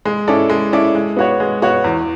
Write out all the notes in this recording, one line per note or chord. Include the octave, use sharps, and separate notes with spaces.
G#3
C#4 E4 A4 D5
G#3
C#4 E4 A4 D5
G#3
B3 F#4 C#5
G#3
B3 F#4 C#5
E2